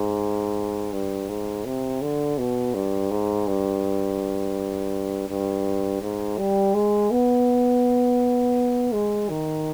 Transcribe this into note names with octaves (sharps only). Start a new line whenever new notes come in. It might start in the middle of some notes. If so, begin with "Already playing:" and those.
Already playing: G#2
G2
G#2
C3
D3
B2
G2
G#2
G2
G2
G#2
G3
G#3
B3
G#3
D#3